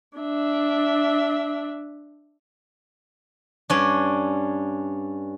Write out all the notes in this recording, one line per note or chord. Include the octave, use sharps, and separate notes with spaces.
D4 E5
G2 C#4 D4